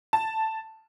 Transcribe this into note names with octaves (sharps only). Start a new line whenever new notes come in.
A5